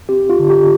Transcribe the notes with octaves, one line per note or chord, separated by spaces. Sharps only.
C4 G4
F4
D3
G4